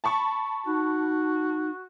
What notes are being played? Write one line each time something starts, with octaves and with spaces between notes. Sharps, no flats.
A5 B5 C#6
D#4 F#4